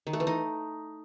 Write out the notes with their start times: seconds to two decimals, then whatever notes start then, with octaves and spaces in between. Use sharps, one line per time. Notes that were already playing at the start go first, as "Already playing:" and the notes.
0.07 D#3
0.13 A3
0.20 E3
0.27 D#4